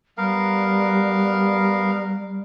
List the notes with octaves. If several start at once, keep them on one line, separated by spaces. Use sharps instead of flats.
G3 B3 A#4 F5